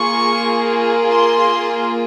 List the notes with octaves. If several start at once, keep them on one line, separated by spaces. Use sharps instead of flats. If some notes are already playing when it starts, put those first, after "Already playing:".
Already playing: A#3 F4 G#4 C#6
C6